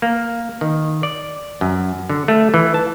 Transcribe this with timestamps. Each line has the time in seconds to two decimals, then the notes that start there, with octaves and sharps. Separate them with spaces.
0.02 A#3
0.61 D#3
1.03 D5
1.61 F#2
2.09 D3
2.28 A3
2.54 E3
2.74 A5